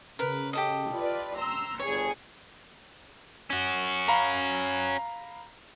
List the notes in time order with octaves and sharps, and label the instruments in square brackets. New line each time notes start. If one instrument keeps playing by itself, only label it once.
[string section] C#3 [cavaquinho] A#4 B4
[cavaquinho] G4 A4 D#5
[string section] F4 B4 D5
A#5 C6 E6
[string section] G1 G#4 C#7 [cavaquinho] C#5
[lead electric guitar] C#4 F#4
[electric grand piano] F5 A#5 B5